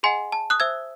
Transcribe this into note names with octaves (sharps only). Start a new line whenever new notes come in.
G#4 D#5 F#5 G#5 C6
A5
D#6 F#6
C5 E5 E6 G#6